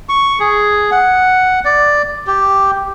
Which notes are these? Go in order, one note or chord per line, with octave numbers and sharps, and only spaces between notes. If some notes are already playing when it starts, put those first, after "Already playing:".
C#6
G#4
F#5
D5
G4